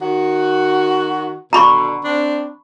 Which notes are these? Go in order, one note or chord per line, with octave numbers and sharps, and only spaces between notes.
D#3 F#4
B2 D3 A#5 B5 C#6
C4 D4